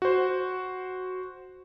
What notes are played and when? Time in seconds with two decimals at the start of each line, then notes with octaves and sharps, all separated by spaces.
0.02 F#4 C5